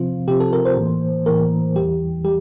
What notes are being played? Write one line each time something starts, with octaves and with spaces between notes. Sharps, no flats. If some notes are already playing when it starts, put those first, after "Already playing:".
Already playing: C3 F3 C4 F4
C3 F3 C4 G4
A4
A#4
C5
A2 E3 A#3
A2 E3 A#3 A#4
E2 E3 G3 G4
G3 G4